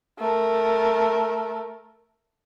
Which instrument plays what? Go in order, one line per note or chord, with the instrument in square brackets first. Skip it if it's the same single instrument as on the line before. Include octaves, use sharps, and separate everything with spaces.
[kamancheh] A3 A#4